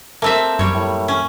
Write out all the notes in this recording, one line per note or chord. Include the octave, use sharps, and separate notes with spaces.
A3 A#3 C4 E5
F#2 G3 C#5
A2
C#4